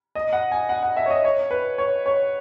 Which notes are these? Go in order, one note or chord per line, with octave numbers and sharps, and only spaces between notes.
D#5
F#5
G#5
F#5
F#5
E5
C#5
D#5
C#5
B4
C#5
C#5